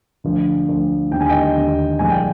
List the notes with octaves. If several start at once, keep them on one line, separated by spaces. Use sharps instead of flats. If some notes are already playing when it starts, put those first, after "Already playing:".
D2 D3 F3
D2 D3 F3
D#2 D3 G3 G5
G#5
D#5 G5
D#2 D3 G3
C2 A#2 F3 G#3 G#5
G5